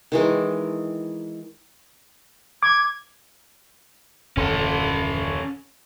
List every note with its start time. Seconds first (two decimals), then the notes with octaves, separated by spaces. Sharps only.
0.12 D#3 E3 G#3
2.63 D6 G#6
4.37 D#1 F#2 D3 C#4 A4